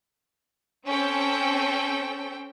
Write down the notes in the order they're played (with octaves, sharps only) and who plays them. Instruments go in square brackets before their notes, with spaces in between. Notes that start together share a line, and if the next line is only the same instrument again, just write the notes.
[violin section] C4 C#4 A4 G5